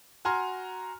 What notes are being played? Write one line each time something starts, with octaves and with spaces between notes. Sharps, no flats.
F#4 G#5 A#5 C6 F6